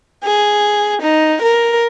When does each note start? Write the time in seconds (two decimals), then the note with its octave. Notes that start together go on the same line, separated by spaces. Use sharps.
0.22 G#4
1.01 D#4
1.41 A#4